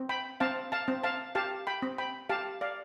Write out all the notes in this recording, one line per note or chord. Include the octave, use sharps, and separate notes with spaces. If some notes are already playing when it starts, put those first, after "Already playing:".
Already playing: C4
G5 B5
C4 F5 A5
F5 A5
C4
F5 A5
G4 F5 A5
G5 B5
C4
G5 B5
G4 F5 A5
D5 F5